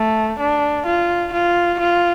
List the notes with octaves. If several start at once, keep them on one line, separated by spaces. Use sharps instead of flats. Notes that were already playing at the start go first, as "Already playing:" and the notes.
Already playing: A3
D4
F4
F4
F4